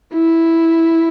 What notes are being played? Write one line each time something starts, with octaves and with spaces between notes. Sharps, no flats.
E4